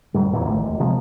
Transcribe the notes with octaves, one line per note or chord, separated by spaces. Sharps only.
D1 F#2 G3
E2 A#2 D#3 E3
G#1 D2 A3
E1
C3 F3 G#3 A#3